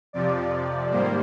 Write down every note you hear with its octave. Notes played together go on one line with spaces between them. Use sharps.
F2 C3 F3 D5
G#2 D#3 G3 A#3 C5